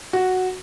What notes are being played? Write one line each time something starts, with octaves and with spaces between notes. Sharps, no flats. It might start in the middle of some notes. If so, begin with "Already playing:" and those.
F#4